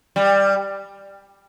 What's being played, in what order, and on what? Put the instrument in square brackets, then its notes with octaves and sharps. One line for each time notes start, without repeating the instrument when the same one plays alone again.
[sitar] G3